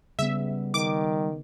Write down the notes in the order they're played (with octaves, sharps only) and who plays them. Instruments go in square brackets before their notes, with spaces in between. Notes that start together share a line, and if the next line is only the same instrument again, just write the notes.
[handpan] C#3 B3 [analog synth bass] G3 [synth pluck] E5
[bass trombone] D#3 [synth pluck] D6